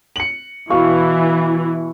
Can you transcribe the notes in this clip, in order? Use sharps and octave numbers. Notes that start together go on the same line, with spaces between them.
C#7 F#7
B2 E3 E4 F5 C#6